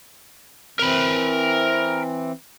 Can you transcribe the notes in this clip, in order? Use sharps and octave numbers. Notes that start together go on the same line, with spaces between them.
E3 C4 A#4 B5